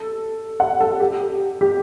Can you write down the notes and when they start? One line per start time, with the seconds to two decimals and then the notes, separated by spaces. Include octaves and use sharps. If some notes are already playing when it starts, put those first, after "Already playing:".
Already playing: A4
0.60 F#5
0.80 A4
1.00 G4
1.61 G4